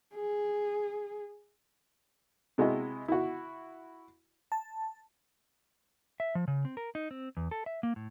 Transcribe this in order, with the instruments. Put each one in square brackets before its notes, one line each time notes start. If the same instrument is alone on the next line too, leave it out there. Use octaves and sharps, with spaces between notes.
[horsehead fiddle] G#4
[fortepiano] C3 G#3 E4 F#4 D#5
E4 F#4
[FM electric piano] A5
[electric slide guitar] E5
F3
C#3
C4
A#4
D#4
C4
E2
A4
E5
A#3
A2